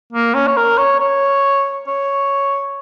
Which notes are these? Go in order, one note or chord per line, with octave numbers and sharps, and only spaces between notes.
A#3
C#4
C#5
A#4
C#5
C#5
C#5